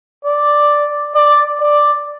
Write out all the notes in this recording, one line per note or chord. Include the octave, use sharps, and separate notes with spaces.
D5
D5
D5